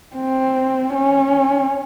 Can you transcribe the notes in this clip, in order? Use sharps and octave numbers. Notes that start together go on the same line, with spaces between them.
C4
C#4